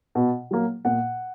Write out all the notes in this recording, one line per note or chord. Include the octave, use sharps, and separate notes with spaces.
B2
F#3 A#3
A#2 F#5